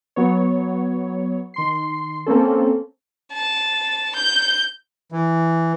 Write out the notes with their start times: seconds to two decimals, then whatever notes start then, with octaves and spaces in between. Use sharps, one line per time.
0.16 F#3 B3 C#5
1.54 D#3 C6 C7
2.26 A#3 C4 C#4 A4
3.33 A5
4.17 G6
5.12 E3